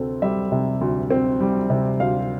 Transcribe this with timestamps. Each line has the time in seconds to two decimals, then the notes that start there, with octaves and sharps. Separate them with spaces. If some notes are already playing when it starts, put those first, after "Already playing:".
Already playing: D2 C3 C4 A4
0.22 G3 E5
0.52 C3
0.81 D2
1.10 C4
1.40 G3
1.70 C3
2.00 D2 F5